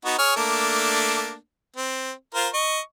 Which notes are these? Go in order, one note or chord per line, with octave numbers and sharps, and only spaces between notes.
B3 D#4 F#4
G#4 C#5 F6
A3 A#3 D4
C4
F4 A#4 C5
D#5 C#6